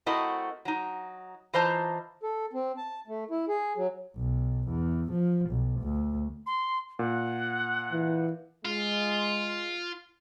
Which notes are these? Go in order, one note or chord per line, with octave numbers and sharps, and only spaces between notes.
A3 C4 E4 F#4 A#4 D#5
F#3 D#4
E3 F4 C5 D#5 A5 A#5
A4
C4
A5
A3
E4
G#4
F#3
B1
E2
F3
B1
D2
C6
A#2 F#5
E3
G#3 F4